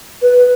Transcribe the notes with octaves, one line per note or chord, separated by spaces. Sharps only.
B4